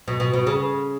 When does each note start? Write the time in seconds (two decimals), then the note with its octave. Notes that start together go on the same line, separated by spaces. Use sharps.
0.08 B2
0.20 B2
0.34 B2
0.47 C#3